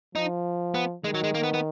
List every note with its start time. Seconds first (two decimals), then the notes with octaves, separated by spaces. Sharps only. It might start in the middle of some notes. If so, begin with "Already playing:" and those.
0.15 F3 D#4
0.74 B3
1.04 D#3 G#3
1.15 F#3
1.24 G#3
1.35 A#3
1.43 B3
1.54 B3